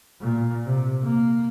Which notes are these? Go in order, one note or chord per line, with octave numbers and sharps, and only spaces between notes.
A#2
C3
A#3